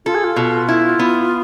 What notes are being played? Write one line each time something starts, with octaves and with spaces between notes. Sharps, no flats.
F4 A4
G#4
F4
B2
E4
B3